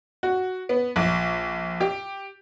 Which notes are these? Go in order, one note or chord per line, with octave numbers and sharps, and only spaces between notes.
F#4
B3
A#1
G4